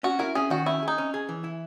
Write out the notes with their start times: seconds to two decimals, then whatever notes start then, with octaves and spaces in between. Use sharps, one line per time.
0.03 C#4 F#4
0.19 E4 A#4
0.35 C#4 G#4
0.50 D#3 F#4
0.66 C#4 E4
0.83 G#4
0.88 D#4
0.98 C#4
1.14 G#4
1.29 E3
1.44 E4